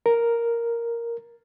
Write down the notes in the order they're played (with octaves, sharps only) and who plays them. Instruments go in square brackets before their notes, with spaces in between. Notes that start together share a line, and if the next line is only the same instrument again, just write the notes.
[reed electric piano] A#4